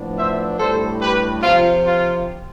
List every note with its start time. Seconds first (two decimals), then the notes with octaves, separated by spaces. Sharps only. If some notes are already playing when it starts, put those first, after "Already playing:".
Already playing: A2 F3 B3 D4
0.17 C5 E5
0.60 A2 G3 D4 A4 C5
1.01 G4 B4
1.42 C3 F3 C4 F4
1.85 F4